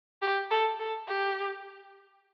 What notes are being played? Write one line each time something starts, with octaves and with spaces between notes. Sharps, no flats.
G4
A4
A4
G4